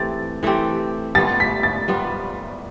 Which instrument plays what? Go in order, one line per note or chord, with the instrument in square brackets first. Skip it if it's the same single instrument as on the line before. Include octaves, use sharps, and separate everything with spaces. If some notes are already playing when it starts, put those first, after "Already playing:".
Already playing: [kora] E3 A3 C4 G4 [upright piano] A6
[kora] E3 A3 C4 G4
[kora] G3 B3 F4 [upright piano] A6
[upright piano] B6
A6
[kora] G3 B3 F4